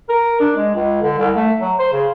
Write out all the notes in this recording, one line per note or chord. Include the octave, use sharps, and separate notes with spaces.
A#4
D4
G#3
C#2
D3
C2
A3
F#3
C5
C#3